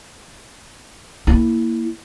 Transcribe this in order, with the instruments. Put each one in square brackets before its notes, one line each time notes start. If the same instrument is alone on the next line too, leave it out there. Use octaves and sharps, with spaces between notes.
[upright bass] A#3 E4